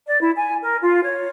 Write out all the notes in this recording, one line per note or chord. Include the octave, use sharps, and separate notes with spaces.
D5
E4
G#5
A#4
F4
C#5